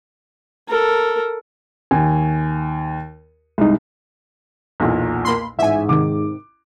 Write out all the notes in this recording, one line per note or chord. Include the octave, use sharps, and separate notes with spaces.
A4 A#4
D#2 G#5
C2 G#3 D#4
B1 E2 A#2
A#3 B5 C6
A1 G#2 E5 G#5
C3 D#3 D6